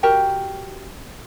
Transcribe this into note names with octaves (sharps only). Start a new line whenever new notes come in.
F#4 G4 A#4 G5